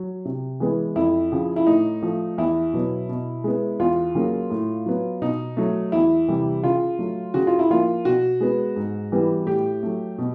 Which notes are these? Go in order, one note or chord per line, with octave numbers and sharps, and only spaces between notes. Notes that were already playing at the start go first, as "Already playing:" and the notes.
Already playing: F#3
C3
E3 G#3 B3
F2 E4
C#3 F3
E4
A2 D#4
F3 A3
E2 E4
B2 F#3 B3
B2
G#3 B3
E2 F4
C#3 F#3 A#3
A2
F#3 B3
B2 D#4
F#3 A3
E2 E4
C3 E3 G3
C#3 F4
F#3 A3
C#3 F#4
F4
E4
F3 A#3 F4
B2 F#4
G#3 B3
G#2
E3 G3 B3
A2 G4
F#3 A3
B2